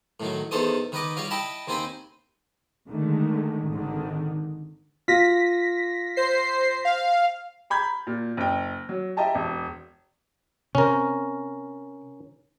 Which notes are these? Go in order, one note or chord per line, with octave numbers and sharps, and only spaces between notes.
A2 D#3 F#3
E2 D#3 A4 C5 C#5 D#6
D#3 B4 D#5 D6
G3 F4 C#5 F5
E4 D#5 G5 A5 B5
D#2 C4 D#4 C5 G#5 B5
D3 D#3 G#3 A3
G#1 D3 D#3
F4 A#6 B6
C5 C7
F5
A#5 B5 G6 G#6
A#2
F#1 G5
F#3
E4 G4 D#5 G5 A5 A#5
E1
C3 C#4 A#4